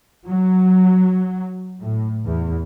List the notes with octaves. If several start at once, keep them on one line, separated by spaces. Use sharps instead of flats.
F#3
A2
E2